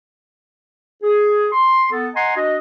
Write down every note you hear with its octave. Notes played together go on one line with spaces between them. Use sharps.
G#4
C6
B3 A4
D#5 F#5 G#5 A#5 C6
D4 F#4 D#5